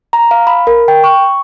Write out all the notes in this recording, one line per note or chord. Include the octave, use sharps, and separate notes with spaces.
A#5
F5
B5
A#4
G5
C#6